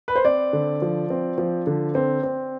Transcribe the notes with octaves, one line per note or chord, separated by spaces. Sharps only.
B4
C5
C4 D5
D3
F3
C4
F3
D3
C4
C4